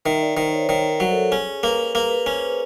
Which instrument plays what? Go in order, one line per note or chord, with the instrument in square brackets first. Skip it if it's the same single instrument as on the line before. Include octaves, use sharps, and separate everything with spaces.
[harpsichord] D#3 [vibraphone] E5
[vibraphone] D5
[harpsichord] D#3 [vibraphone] C5
[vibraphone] C#5
[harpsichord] D#3
[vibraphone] A#4
[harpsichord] F#3
[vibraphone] A4
[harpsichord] C#4 [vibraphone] G#4
[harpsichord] A#3 [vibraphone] B4
[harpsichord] A#3 [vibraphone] A#4
[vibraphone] B4
[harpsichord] C#4 [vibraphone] C5